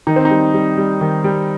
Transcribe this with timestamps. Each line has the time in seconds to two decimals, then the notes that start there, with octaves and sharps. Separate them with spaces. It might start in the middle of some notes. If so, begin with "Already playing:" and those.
0.07 D#3 D#4
0.16 C4
0.25 D#4
0.31 G3
0.54 G3
0.78 G3
1.01 D#3
1.24 G3